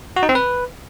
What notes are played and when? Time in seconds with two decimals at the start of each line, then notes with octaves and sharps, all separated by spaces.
0.16 F#4
0.23 D#4
0.29 C4
0.35 B4